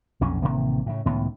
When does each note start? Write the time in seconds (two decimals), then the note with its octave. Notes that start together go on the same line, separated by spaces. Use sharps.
0.21 B1 F2 A#2 C#4
0.42 A1 C3 D#3 A#3
0.86 A2 C#3
1.05 C#2 A2 D#3 B3